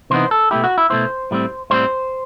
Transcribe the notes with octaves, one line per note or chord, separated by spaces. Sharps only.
C3 E3 B3 D#4 C5
A4
B2 A3 E4 G4
F#4
E4
B2 A3 E4 C5
A2 G3 C4
A2 G3 C4 C5